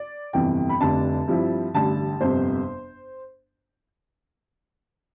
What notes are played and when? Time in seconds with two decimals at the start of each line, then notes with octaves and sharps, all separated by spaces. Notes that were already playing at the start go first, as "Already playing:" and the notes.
Already playing: D5
0.33 G1 F2 C3 E3 G5
0.69 B5
0.80 F1 F2 D3 G3 D4 A5
1.28 G2 F3 C4 E4
1.74 A1 G2 D3 A5
2.21 G1 F2 C3 C5